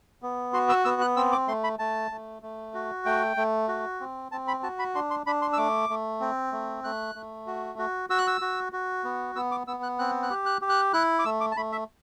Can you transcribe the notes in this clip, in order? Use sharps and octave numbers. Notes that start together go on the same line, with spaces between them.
B3
F#4 C6
E6
B3 E6
F#6
C4 E6
D6
A3 C6
B5
A3 A5
A3
A3
F#4
A3 G5
A3
F#4
C4
C4 A5
B5
F#4 A5
B5
D4 C6
C6
D4 B5
C6
E6
A3 D6
A3
C4
A3
A3 F#6
A3
F#4
F#4
F#4 E6
F#6
E6
F#4
F#4
B3
B3 E6
D6
B3 E6
F#6
C4 F#6
F#6
G4
F#6
G4
F#6
E4 F#6
D6
A3 E6
D6
A5
A3 B5
E5